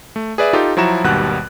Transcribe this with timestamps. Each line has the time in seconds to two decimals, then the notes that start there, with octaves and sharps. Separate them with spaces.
0.16 A3
0.38 G#4 B4 D5 E5
0.53 D#4 F4 G4 A4
0.77 F3 F#3 E4 F#4 A#5 E7
1.04 G#1 D#2 B2 G3 F#5 F#6